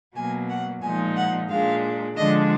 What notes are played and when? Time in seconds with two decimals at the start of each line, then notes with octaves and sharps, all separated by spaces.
0.16 B2 F#3 A#3 G#5
0.50 F#5
0.83 A#2 F3 G#3 D#4 G#5
1.17 F#5
1.50 A#2 G#3 D4 F5
2.17 D3 F3 G#3 D4 D#5